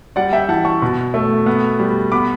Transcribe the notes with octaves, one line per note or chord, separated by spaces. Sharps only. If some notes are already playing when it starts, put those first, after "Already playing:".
G3 D5 F#5
E5 G5
E3 F#5 A5
A5 C#6
B2
A3
B3
G3
B3 B5 D6